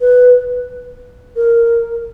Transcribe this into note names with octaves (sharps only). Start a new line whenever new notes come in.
B4
A#4